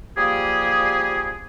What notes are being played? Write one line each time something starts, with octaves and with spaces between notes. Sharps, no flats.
F3 G3 A#3 G4 G#4